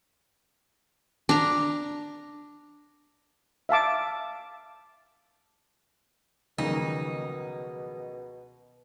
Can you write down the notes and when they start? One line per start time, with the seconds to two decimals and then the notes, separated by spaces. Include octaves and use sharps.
1.29 D4 A#5
3.69 E5 F5 A5 D6
6.58 C#2 B2 D#3 F3 F#3 A#3 D#4